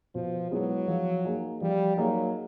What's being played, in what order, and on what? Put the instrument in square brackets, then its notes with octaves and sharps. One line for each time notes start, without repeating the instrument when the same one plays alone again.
[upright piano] B2 [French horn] F3
[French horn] F#3 [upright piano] G#3 B3 E4
[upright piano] F3
A#3 D#4 G#4
[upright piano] F3 [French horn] G3
[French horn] F#3 [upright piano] A#3 D#4 G#4